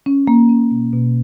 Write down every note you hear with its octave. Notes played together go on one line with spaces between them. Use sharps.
C#4
A#3
C#4
B2
B2